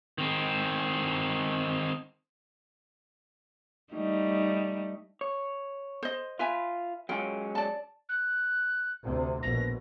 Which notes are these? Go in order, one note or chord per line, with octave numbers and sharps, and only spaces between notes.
D#3 C4
G3 A3 D#4
C#5
C5 D#5
F4 B4 E5 G#5
F#3 G#3 C#4 F4 G5
D5 A5
F#6
D2 C3
A#1 B2 A#6